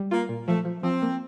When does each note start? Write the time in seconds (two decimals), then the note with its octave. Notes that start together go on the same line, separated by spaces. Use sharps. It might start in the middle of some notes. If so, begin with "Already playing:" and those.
Already playing: G3
0.11 A#3 F4
0.29 A#2
0.47 F3 A3
0.65 F3
0.83 F3 C4
1.02 A#3